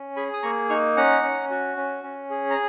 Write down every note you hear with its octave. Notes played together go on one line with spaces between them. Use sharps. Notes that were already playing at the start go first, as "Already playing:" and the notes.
Already playing: C#4
G#4 G#5 B5
D#6
A#3 A#5 C#6
D#4 C#6 F6
C#4 F#5 A#5
C#4
F#4
C#4
C#4
G#4
A#5